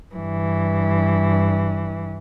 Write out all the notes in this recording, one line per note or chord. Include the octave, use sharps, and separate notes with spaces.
G2 E3